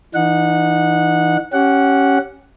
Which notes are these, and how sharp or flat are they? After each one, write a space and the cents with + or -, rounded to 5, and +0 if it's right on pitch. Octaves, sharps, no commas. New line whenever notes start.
E3 +0 D#4 -30 F#5 -15
C#4 +0 G4 -20 F#5 +0